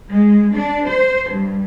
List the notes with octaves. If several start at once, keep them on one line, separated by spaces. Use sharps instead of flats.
G#3
D4
C5
G2